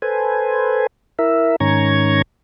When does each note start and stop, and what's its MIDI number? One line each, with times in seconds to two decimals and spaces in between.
0.02 0.87 69
0.02 0.87 71
0.02 0.87 72
0.02 0.87 80
1.19 1.56 64
1.19 1.56 70
1.19 1.56 76
1.60 2.22 44
1.60 2.22 51
1.60 2.22 61
1.60 2.22 82
1.60 2.22 85
1.60 2.22 92